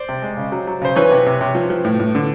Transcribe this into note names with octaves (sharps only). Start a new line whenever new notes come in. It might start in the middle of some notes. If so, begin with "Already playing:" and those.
Already playing: C5 D5
C3
G#3
C#3
F#3
F#3
C#3 C5
E3 B4 C#5
C3
C3
C3
F3
F3
A2
A2
D3